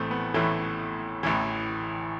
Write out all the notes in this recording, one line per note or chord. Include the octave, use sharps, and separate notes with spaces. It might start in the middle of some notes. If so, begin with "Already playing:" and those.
Already playing: A1 A2 E3 A3 C4
B3
A1 A2 E3 A3
A1 A2 E3